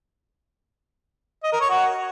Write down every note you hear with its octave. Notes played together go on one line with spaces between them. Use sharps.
D#5
A#4
C#5
F#4